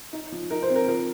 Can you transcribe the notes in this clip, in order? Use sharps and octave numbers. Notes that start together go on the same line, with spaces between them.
D#4
F3
D#4 A#4
C5
C4
A#4
F3 A#4